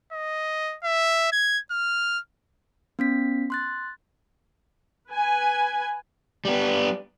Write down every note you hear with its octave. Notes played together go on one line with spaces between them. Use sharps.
D#5
E5
G#6
F6
B3 C#4 B6
C6 F#6 A6
B4 G#5
G3 B3